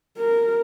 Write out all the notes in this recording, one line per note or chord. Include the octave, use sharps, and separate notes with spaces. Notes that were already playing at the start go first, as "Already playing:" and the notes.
A#4